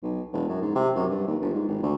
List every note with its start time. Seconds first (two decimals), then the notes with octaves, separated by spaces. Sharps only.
0.03 B1
0.33 E1
0.49 F#2
0.62 G#2
0.75 C3
0.95 F#2
1.10 G2
1.27 D#2
1.41 G1
1.54 G#2
1.68 G#1
1.82 D2